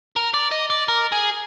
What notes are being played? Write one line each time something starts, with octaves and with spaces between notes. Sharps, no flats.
A#4
D5
D#5
D5
A#4
G#4